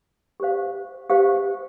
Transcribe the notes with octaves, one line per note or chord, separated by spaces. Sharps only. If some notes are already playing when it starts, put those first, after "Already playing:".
G4 C5 F5
G4 C5 F5